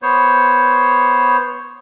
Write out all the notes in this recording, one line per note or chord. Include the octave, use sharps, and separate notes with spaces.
B3 C5 C#5